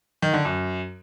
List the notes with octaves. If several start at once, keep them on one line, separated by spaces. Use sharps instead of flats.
D#3
D3
F#2